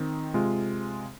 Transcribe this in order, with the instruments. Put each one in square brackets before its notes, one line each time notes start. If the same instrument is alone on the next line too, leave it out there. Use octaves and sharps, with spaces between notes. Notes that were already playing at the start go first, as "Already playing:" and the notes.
Already playing: [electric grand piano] D#3 C4 D#4
C3 G#3 F4